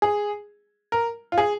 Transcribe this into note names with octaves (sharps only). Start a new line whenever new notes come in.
G#4
A#4
F4
G#4